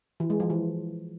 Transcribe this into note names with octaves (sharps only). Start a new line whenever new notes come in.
E3
G#3
F3
E3